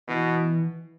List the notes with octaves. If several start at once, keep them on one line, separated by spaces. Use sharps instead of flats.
B2 E3